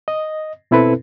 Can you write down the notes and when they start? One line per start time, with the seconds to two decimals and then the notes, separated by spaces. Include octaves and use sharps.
0.08 D#5
0.71 B2 C4 E4 A4 B4